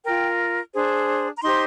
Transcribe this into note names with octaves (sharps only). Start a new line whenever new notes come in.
F4 A#4 G5
D4 G#4 C5
A#5
D#4 G4 C5 C6